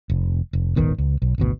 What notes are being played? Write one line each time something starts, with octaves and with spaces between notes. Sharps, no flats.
F1
F1
D#1 G#1 D#3 B3
C#2
B1
G#1 D2 B2